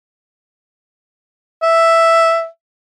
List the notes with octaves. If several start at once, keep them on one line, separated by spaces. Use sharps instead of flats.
E5